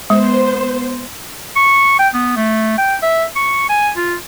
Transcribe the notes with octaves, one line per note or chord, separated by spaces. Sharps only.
G#3 B3 C5
C#6
G5
B3
A3
G5
E5
C#6
G#5
F4